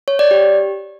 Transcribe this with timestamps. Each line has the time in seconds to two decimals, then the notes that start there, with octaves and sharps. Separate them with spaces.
0.08 C#5
0.19 D5
0.31 G4